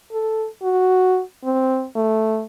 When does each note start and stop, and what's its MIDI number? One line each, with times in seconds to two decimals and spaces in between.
0.12 0.46 69
0.63 1.21 66
1.44 1.86 60
1.96 2.44 57